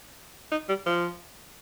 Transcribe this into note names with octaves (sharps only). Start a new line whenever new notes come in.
D#4
G3
F3